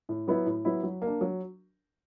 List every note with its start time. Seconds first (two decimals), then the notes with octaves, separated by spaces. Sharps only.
0.09 A2
0.28 F#3 B3 E4
0.46 A2
0.65 F#3 B3 E4
0.83 F#3
1.02 A#3
1.07 D4
1.21 F#3